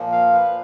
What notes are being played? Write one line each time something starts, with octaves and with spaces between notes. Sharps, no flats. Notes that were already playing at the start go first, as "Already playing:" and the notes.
Already playing: A#2 F3 A#3
F5
B4